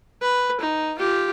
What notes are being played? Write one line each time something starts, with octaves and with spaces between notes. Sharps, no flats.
B4
D#4
F4 G4